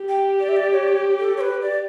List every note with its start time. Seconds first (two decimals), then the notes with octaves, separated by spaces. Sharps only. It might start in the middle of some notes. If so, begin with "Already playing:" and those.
Already playing: G4
0.09 G5
0.40 D5
0.49 E5
0.56 D5
0.72 C#5
0.83 D5
0.88 C#5
1.19 A4
1.37 C#5
1.41 B4
1.62 D5